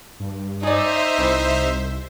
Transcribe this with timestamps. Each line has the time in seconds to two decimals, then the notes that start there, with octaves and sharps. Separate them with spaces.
0.20 G2
0.63 D#4 G#4 C5 D5 E5
1.18 C2 D#3 E3 C4